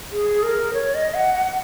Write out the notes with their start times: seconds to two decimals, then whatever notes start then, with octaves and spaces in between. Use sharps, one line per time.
0.12 G#4
0.43 A#4
0.74 C#5
0.95 D#5
1.14 F#5
1.35 F#5